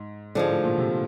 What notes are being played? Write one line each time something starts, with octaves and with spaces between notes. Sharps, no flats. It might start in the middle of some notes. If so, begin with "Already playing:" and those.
Already playing: G#2
G#2 D3 F3 G#3
A2
A#2
C3